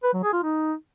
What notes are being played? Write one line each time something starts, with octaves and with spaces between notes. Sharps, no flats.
B4
F#3
G#4
F4
D#4